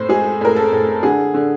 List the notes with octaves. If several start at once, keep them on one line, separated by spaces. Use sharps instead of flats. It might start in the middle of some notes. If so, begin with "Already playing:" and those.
Already playing: A2 C5
G#3 G#4
A2 A#4
A4
A2
D3 G#4
D3